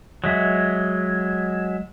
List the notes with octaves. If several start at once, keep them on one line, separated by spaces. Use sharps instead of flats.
F#3 G#3 E5